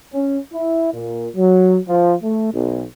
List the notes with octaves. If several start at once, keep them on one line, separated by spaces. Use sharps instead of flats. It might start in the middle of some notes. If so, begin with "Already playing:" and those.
C#4
E4
A#2
F#3
F3
A3
B1